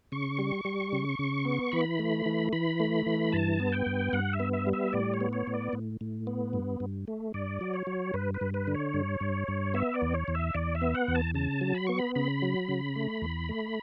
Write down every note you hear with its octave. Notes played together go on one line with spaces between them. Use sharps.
C#3 C#6
G3
G3
C#3
C#3
B3
E3 B5
A3
E3
E3 B5
A3
E3
G2 A5
B3
G5
G2
G2 F#5
E5
B3
E5
G3
E5
A2 D5
C#5
B3
C#5
A2
D5
A2
A2
B3
G2
G2
A3
G2 D5
F#3
C#5
F#3
G2 B4
B4
G2
B4
D3
C#5
G2
G2
G2
B3 E5
D5
E2
C#5
E2
E5
E2 D5
E5
B3
F#5
E2
A5
C#3 A5
F#3
B5
B3 C#6
B5
C#3 B5
F#3
C#3
A3
E2
A3